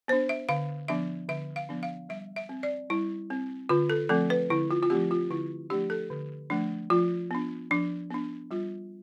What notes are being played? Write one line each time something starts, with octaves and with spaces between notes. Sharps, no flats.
B3 D4 C5
E5
D3 F5
F3 B3 D4 E5
D3 E5
F5
F3 B3 D4
F5
G3 E5
E5
C4
D5
G3 E4
C4
D3 F4
A4
F3 A3 C4 A4
B4
D3 E4
F4
F4
F3 A3 C4 G4
F4
D3 E4
F3 A3 D4 G4
A4
D3
F3 A3 D4
F3 F4
B3 D4
F3 D4
B3 D4
G3 F4